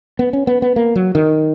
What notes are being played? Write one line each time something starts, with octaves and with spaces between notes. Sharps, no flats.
B3
C#4
B3
B3
A#3
F#3
D#3